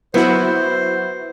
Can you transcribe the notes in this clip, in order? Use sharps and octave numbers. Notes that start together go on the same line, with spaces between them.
F#3 B3 E4 F#4 C5